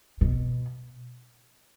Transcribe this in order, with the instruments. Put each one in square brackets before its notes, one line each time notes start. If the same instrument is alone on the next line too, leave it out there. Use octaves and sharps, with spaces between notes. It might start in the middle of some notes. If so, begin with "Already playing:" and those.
[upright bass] B2